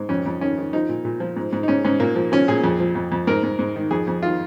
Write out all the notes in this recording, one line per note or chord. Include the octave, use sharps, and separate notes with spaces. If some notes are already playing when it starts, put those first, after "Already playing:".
Already playing: G#2
F2 C#4
F2
D#3 C#4
D#3
F3 D#4
A#2
A#2
F3
G#2
G#2
D#4
G#2 C#4
G#2 C#4
A#2 A#3
F3
F3 C#4
A#2 G#4
F2
F3
F2
F2
G#2 A#4
G#2
G#2
D#3
F2 G#4
F2
D#3 F4